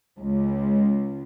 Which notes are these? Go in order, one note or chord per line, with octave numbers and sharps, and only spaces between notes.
C#2